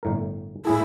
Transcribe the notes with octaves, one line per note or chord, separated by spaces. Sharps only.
G1 A2 A#4
A2 E4 G#4 A4